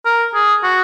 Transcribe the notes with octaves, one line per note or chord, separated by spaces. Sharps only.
A#4
G#4
F#4